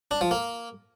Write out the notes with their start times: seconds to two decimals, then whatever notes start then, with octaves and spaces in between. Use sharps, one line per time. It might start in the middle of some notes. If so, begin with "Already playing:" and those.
0.11 D4
0.21 F3
0.31 A#3